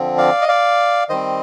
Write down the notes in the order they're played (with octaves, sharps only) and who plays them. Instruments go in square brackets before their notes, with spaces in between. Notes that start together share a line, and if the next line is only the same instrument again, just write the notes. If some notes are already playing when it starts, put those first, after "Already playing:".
Already playing: [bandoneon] D3 F3 C4
D5 F5
D#5
D5 F5
D#3 G3 C4 C5 D#5